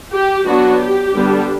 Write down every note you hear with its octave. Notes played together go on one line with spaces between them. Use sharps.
G4
F#3 B3 D4 F#4
G4
D3 G3 B3 D4